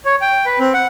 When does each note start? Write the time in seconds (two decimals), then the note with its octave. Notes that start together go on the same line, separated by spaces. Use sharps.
0.05 C#5
0.21 G5
0.46 B4
0.59 C4
0.74 F#5